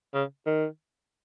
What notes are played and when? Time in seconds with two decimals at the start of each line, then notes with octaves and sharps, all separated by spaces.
0.14 C#3
0.46 D#3